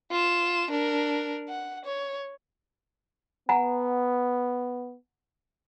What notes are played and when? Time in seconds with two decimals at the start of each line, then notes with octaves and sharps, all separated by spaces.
0.11 F4 E7
0.71 D4 A#4
1.49 F#5
1.85 C#5
3.49 B3 F#5 G#5 A#5